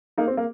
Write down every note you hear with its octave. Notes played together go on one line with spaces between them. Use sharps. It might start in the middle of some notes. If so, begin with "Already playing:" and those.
A#3 D#4
C4
A#3